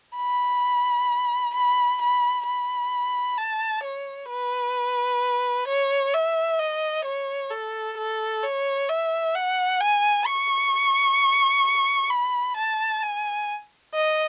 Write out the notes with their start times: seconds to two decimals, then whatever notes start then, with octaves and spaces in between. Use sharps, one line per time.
0.17 B5
1.55 B5
2.01 B5
2.47 B5
3.38 A5
3.84 C#5
4.30 B4
5.68 C#5
6.14 E5
6.59 D#5
7.05 C#5
7.51 A4
7.98 A4
8.43 C#5
8.89 E5
9.36 F#5
9.81 G#5
10.27 C#6
12.10 B5
12.57 A5
13.03 G#5
13.94 D#5